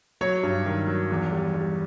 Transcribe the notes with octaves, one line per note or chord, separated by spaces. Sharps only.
F#3 C#5
G2
D#3
F#3
E2
G3
G3